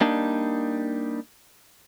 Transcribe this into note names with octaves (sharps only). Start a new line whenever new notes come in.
G3 A#3 D4 D#4